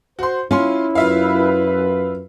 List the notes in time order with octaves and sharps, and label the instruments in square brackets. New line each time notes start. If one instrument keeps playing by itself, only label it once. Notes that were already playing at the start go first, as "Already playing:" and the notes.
[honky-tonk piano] F#4 C6 [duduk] C5
[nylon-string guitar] C#4 [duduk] E4 [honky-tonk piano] F4 C6
[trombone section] F#2 B4 [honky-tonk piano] F4 E5 F5